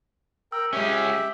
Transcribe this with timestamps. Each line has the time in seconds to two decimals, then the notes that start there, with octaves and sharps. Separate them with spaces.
0.52 A#4 G5 E6
0.73 G#3 C#4 G4 E5 G7